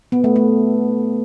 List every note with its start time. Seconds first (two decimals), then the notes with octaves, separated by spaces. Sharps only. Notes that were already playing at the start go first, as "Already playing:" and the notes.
0.12 B3
0.24 A3
0.36 A3